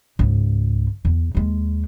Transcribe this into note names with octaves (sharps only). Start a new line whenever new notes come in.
C#2 G#2
E2
D#2 G#3